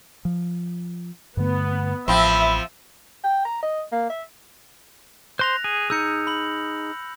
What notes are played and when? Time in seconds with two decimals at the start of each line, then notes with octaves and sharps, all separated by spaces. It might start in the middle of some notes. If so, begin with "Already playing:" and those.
0.25 F3
1.37 G2 D3 A3 B3
2.08 A1 F3 C4 E5 B5
3.24 G5
3.45 A#5
3.63 D#5
3.92 A#3
4.10 E5
5.39 C5 C6 F#6 A#6 F7
5.64 G#4
5.90 D#4 G#4 E6 G6 C#7
6.27 B5 F#7